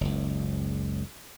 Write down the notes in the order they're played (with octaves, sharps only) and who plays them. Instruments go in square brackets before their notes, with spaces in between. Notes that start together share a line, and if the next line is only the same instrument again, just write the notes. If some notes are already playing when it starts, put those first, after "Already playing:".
[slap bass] F#1 C#2